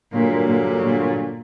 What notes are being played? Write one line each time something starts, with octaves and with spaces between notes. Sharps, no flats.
G2 A#2 D3 F#3 A#3
A#2
A#2